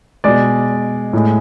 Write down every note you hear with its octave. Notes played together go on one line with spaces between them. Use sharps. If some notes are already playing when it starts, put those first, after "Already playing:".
B2 G#3 D5
A2 G#3